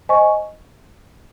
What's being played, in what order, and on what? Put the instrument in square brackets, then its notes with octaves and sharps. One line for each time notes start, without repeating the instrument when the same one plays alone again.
[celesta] C5 D#5 G#5 C#6